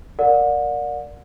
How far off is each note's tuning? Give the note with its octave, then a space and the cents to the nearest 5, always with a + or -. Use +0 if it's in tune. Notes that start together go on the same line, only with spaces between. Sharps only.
A#4 +0 D5 +0 F#5 -40